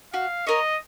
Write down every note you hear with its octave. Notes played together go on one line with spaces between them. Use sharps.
F#4 F5
A#4 C#5 D#5